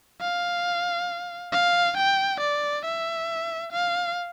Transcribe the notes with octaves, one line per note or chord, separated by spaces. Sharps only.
F5
F5
G5
D5
E5
F5